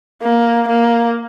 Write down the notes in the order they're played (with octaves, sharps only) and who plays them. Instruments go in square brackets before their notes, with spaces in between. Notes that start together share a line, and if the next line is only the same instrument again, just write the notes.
[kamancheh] A#3
A#3